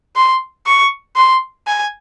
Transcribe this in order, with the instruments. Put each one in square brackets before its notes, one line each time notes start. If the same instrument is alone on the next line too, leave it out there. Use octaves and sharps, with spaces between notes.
[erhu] C6
C#6
C6
G#5